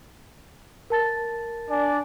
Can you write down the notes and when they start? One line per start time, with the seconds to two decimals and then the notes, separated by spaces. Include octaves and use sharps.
0.90 A#4 A5 A6
1.70 D4 D5 G#5